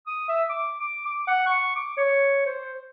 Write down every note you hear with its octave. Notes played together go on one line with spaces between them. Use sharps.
D#6
E5
D6
D6
D6
F#5
C#6
D6
C#5
C5